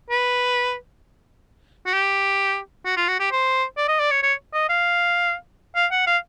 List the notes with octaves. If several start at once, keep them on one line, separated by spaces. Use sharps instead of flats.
B4
F#4
G4
F#4
F4
F#4
G4
C5
D5
D#5
D5
C#5
C#5
D#5
F5
F5
F#5
F5